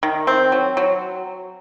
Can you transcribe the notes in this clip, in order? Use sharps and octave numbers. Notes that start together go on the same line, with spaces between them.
D#3
C4
F#3
F#3